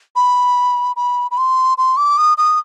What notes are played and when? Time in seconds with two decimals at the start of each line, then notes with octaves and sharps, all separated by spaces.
0.16 B5
0.96 B5
1.31 B5
1.38 C6
1.78 C6
1.97 D6
2.18 D#6
2.38 D#6